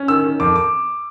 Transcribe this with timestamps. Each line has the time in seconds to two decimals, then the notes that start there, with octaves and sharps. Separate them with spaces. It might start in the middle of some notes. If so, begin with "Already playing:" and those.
Already playing: C#4
0.08 D#3 E6
0.24 D#3
0.40 F2 D6
0.56 D6